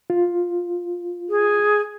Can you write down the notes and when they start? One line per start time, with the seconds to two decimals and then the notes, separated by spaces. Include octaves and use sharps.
0.10 F4
1.29 G#4